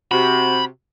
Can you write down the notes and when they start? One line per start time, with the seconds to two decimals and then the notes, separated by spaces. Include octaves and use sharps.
0.11 C3 F#4 B5